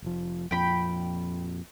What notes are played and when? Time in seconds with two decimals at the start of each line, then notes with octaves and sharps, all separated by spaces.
0.02 F1 F3
0.51 F2 A#2 F3 G5 B5